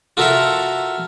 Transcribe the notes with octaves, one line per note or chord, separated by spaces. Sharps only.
F4 F#4 A4 A#4 E5 F5